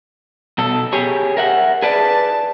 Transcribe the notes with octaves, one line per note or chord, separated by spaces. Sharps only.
B2 A4
G4 G#4 C#5
A#4 E5 F#5
G#4 B4 D5 A5